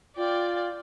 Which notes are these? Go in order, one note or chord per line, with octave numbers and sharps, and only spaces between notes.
F4 D5 G5